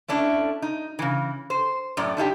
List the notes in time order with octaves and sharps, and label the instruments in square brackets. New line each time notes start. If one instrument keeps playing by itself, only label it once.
[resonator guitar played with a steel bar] A3 C#4 D4 E4
D#4
C#3 E3
C5
F#2 A2 D5
D4 D#4 F4 G4